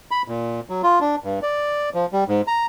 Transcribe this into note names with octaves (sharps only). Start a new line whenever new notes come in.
B5
A#2
F#3
F4
D4
G2
D5
F3
G3
G#2
A#5